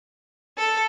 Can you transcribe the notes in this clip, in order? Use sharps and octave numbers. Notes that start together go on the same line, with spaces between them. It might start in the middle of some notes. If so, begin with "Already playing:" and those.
A4